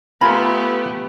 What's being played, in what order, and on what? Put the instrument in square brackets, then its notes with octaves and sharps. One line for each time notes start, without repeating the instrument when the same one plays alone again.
[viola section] A3 B3 G4 [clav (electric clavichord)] F4 G#5 A#5 [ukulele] B5